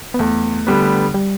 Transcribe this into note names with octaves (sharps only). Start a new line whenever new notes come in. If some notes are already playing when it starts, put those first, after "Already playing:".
B3
E2 A3
D3 G3 B3
G3